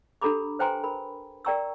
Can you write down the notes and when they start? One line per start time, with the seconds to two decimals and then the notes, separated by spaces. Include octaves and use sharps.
0.22 D4 G4 A4 A#5 B5 D6
0.59 B4 C5 G5 G#5 A#5 C6
0.84 A#4 B5
1.45 A#4 D5 G5 A#5 C#6 E6